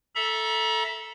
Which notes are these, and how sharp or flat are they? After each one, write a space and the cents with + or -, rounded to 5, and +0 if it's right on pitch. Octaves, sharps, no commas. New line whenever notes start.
A4 +0 E5 +0 A#5 +35